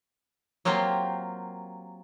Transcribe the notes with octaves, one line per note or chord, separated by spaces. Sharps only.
F#3 A#3 C4 F4 G4